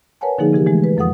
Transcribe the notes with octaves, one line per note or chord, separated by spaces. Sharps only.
A#4 B4 C#5 F#5 G#5 A5
D3 F3 A#3 D#4 G#4
C3 E3 G4 A#4
E3 G#3 A3
B4
F2 F3 A4 F#5 D#6